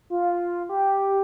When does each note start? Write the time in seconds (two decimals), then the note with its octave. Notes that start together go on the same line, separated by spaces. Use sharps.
0.10 F4
0.69 G4